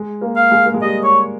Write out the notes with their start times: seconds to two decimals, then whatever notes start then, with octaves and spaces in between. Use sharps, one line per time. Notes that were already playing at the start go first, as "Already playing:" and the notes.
Already playing: G#3
0.21 A#3
0.36 F5
0.51 G#3
0.65 A#3
0.74 G#3
0.82 G3 D#5
1.04 C#5